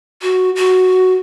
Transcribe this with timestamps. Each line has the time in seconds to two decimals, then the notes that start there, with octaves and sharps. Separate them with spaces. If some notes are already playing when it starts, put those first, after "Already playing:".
0.22 F#4
0.56 F#4